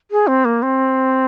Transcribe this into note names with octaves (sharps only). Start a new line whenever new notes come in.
G#4
C4
A#3
C4